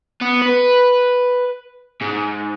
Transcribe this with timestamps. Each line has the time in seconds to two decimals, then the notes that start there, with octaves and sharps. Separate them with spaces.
0.21 B3
0.42 B4
2.02 G#2